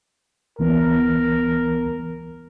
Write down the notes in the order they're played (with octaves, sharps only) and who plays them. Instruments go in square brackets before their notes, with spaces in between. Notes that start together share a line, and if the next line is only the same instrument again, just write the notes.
[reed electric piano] C#2 E3 B3 [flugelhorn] A#4